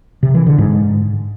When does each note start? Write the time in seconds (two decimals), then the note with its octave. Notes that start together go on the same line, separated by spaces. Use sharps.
0.23 C3
0.35 E3
0.46 D3
0.58 G#2